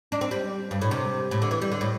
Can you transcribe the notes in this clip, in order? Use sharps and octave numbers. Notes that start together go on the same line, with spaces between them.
D4
C4
G3
G2
A2
C3
A2
D3
E3
G3
D3
A2